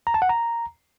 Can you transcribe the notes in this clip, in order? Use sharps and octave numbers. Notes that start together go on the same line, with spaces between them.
A#5
A5
F#5
A#5